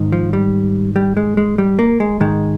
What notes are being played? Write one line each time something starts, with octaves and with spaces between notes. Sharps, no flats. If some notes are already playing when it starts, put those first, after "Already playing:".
Already playing: G#2 D#3
F3
G3
G3
G#3
G#3
G3
A#3
G#3
G#2 D#3 G#3